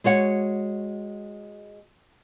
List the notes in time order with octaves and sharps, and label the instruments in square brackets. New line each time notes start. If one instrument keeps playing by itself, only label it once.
[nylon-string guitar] G#3 F#4 C#5 F#5